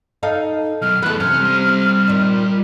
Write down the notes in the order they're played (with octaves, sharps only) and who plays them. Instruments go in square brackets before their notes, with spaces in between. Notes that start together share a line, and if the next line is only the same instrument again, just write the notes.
[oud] D#4 A4 F5
[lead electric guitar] B1 F#2 [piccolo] F6
[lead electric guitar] E2 [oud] A3 B3 [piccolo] F#6
[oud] C3 [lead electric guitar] C#4 [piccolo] F6
[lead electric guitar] G3 C6
[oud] A#2 D#3